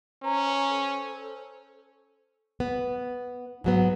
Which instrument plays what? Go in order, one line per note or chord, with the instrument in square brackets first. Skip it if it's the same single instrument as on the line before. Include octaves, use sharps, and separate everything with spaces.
[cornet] C#4 [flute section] B4 C5 A#5
[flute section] A4 C5
[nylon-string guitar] B3
G#2 F#3 B3